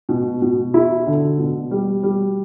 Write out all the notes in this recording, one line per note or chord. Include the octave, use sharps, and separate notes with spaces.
B2
B2
E4
D3
B2
G3
G3